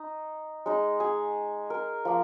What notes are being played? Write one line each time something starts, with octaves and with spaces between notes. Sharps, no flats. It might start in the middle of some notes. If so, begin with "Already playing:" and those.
Already playing: D#4 D#5
G#3 D#4
G#4
A#4
F3 A#3